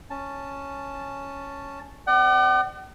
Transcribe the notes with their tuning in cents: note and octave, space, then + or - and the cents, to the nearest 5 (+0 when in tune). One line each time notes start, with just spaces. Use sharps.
C#4 +0 A5 +5
C4 +0 D5 +35 F#5 +45